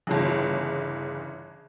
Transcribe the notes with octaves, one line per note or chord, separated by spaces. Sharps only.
G1 C#3 E3